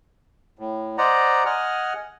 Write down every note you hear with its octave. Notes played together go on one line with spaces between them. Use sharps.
A2
C5 D5 D#5 F#5 A#5
D#5 F#5 G#5 F6